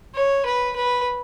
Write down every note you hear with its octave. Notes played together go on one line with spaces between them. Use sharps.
C#5
B4
B4